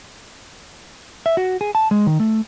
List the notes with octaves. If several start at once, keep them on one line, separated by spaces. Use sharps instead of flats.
E5
F#4
G#4
A5
G#3
D#3
A3